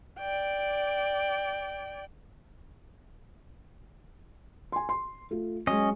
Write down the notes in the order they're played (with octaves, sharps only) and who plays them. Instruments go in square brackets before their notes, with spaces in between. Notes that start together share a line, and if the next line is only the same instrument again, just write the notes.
[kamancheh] D5 G5
[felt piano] G#5 C6
C6
A3 F4
[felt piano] F#3 G#3 [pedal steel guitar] C#4 D#5